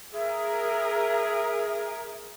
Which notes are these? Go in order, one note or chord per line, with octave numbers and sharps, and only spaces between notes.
G#4 A#4 E5